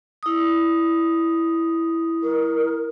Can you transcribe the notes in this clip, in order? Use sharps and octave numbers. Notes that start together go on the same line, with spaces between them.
E4 D#6
A#4